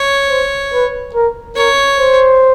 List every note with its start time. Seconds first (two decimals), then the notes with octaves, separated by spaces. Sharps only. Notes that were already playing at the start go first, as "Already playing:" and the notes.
Already playing: C#5
0.30 C5
0.73 B4
1.14 A#4
1.56 A#4 C#5
1.98 C5